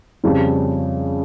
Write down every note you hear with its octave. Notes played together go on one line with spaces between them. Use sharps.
F2 C#3 G3 C#4